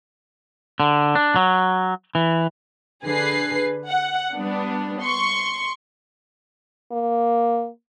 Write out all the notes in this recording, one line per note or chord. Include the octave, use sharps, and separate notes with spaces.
D3
D4
F#3
E3
D3 G#4 B4 C7
F#5
G3 B3 D4
C6 C#6
A#3